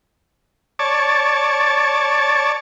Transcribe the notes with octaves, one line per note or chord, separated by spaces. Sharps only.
C#5 D5 A5